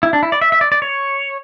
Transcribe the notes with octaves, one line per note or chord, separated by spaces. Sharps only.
E4
D4
E4
D5
E5
E5
D5
D5
C#5